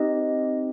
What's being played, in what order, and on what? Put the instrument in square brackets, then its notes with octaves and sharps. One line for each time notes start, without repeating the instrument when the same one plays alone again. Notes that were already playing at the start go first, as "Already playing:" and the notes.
Already playing: [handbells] C4 D#4 G4 D#5